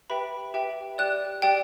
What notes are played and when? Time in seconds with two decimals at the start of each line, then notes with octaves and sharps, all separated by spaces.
0.10 G4 B4 E5 G5 B5
0.54 G4 B4 E5 G5
0.98 G4 D5 G5 F#6
1.42 G4 D5 G5